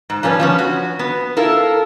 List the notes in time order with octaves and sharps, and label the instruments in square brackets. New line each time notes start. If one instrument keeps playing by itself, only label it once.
[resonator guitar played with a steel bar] G#2
F3 G3 C#4 A4 B4
F3 B3 C#4
F#4
B3
E4 F4 A4 A#4